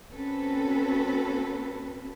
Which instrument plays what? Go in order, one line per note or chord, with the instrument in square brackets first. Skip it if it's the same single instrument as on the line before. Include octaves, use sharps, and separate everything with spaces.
[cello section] A#3 C4 C#4 F#4 A4 B4